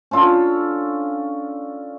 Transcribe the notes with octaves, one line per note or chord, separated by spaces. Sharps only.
C#4 D4 F4 A4